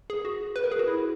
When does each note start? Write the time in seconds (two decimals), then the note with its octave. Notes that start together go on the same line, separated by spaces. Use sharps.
0.10 G#4
0.25 F#4
0.56 B4
0.64 A#4
0.72 G#4
0.79 F#4
0.88 E4